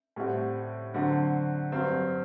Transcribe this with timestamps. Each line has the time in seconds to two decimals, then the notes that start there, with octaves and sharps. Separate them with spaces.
0.16 A2 G3 C4 F#4
0.94 D3 F#3 C4 F#4
1.72 G2 F#3 C4